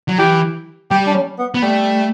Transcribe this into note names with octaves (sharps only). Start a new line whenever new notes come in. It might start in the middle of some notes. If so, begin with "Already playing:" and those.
F#3
E3 G4
G3 G4
D4
C#4
B3
B3
G3 A3